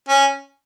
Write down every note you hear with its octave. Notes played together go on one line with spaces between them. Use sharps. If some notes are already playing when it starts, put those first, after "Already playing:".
C#4